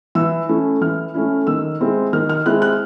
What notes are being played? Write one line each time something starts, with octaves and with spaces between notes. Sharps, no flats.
E3 E6
A3 C#4 E4
E3 F6
A3 C#4 E4
D#3 E6
G#3 C4 E4
D#3 F6
F6
G#3 C4 E4 F#6
F#6